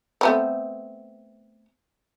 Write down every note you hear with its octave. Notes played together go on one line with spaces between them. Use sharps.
A3 B3 C4